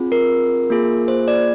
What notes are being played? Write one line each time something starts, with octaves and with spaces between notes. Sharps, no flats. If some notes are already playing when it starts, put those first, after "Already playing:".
Already playing: C4 F4 G#4
A#4
A#3 F4 G#4
C5
D5